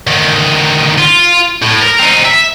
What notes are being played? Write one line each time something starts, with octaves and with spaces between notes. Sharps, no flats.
D2 D#3
F4
A2
A#4
C4 D#4
E5